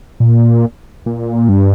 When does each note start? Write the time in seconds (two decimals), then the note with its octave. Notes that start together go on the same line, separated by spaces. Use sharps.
0.20 A#2
1.06 A#2
1.49 G2